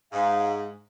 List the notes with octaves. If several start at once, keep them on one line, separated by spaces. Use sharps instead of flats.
G#2 F5